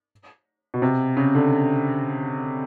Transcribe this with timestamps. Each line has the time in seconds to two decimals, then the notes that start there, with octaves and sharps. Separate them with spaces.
0.74 B2
0.82 C3
1.17 C#3
1.35 D3